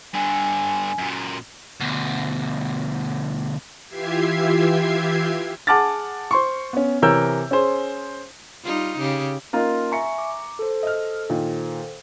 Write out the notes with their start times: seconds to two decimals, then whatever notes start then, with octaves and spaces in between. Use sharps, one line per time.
0.14 G2 D3 G#5
0.98 F#2 A#2
1.80 D2 B2
3.88 E3 F4 G4 E5 G#6 C7
5.67 G#4 F#5 A5 D6 F6 A6
6.31 C5 C6 C#6
6.73 B3 C#4
7.02 C3 E3 A#4 C#5 E6 G6
7.51 C#4 G#4 C5
8.65 G3 D#4 F4
8.98 C#3 G4
9.53 A#3 C#4 D#4 F4 C6
9.92 E5 G#5 A#5 C#6 C#7
10.18 D6
10.59 A4 C5
10.83 D#5 F6
11.29 A#2 D#3